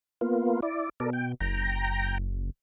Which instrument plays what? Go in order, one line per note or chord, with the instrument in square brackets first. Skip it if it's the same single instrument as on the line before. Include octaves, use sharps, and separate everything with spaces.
[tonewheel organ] A#3 B3 F4
E4 D5
[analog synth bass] B2 [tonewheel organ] A4 A#4 D5
[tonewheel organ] G5
[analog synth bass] F#1 [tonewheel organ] G5 A#5